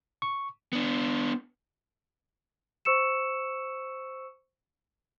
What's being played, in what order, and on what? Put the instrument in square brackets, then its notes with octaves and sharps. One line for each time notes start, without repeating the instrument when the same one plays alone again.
[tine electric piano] C#6
[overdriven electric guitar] B3 D4
[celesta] C5 C#6 E6 C#7 E7